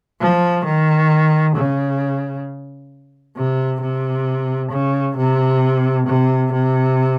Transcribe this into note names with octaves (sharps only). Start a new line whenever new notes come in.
F3
D#3
C#3
C3
C3
C#3
C3
C3
C3